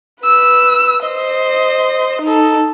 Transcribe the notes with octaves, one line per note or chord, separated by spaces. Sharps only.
B4 E6
C5 D#5
D#4 A4